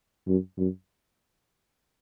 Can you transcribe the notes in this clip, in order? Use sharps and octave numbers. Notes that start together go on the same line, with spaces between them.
F#2
F#2